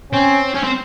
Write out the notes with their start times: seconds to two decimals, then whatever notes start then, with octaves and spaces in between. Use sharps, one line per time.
0.12 C4 C#4
0.55 C#4
0.64 C4